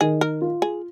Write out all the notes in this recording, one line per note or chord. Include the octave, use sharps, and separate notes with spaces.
D#3 G#4
A#4
F4
G#4